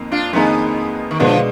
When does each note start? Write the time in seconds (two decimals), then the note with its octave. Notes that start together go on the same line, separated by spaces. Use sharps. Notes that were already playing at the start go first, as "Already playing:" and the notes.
Already playing: F2 D#3 A#3
0.11 D4 F4
0.33 F2 D#3 G#3 A#3 B3 D#4
1.11 D#3
1.19 B2 D3 F3 G#3 B3 D4